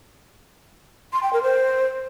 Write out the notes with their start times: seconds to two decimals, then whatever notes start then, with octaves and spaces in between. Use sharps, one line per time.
1.13 C6
1.23 G5
1.33 A#4
1.43 C5